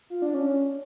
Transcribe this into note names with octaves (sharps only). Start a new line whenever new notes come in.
F4
D4
C#4